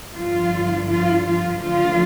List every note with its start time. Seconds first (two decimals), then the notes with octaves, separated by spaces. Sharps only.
0.15 G2 D3 F3 F4
0.89 F3 F4
1.25 F3 F4
1.61 D2 D3 F3 F4